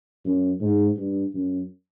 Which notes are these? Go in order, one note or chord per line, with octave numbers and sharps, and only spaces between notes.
F#2
G#2
G2
F#2